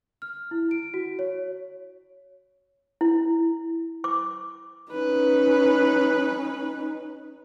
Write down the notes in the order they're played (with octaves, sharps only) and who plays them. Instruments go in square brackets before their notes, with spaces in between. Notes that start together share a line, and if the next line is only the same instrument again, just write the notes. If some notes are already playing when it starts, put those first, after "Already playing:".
[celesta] F6
E4
D7
F#4
C#5
[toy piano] E4
D6
[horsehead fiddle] C#4 D#4 [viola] B4